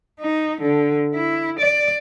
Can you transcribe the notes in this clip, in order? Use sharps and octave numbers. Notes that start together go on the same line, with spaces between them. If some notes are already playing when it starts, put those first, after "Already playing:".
D#4
D3
E4
D5